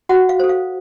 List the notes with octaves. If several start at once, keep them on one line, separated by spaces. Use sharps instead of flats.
F#4 F#5
F5
A4 C5
F5